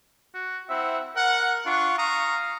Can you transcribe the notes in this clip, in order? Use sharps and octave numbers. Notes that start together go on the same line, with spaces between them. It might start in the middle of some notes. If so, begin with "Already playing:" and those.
F#4
C4 E4 E5 F#5
A#4 F#5
D4 F4 F#5 C#6
F5 A#5 C#6 D#6